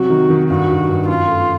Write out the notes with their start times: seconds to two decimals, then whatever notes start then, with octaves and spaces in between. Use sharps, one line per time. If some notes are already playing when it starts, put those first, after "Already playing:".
Already playing: C3 F#3 F#4
0.10 D#3
0.30 D#3
0.50 G2 F#4
0.69 G2
0.89 G2
1.08 F#2 F4
1.28 A3